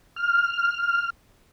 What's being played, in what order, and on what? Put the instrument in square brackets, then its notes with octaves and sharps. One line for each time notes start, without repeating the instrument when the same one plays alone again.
[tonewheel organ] F6